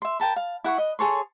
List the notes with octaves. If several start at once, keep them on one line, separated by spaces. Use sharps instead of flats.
E5 C6
A#4 G5 A5 B5
F5
E4 F#5 B5 C#6
D#5
G#4 A4 C#5 C6